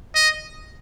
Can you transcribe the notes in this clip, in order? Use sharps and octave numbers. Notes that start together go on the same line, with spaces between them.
D#5